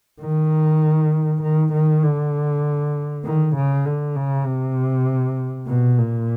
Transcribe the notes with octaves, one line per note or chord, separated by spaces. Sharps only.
D#3
D#3
D#3
D3
D#3
C#3
D3
C#3
C3
B2
A#2